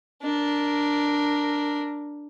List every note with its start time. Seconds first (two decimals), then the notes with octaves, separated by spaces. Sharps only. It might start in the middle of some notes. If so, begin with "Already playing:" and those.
0.23 D4 A#4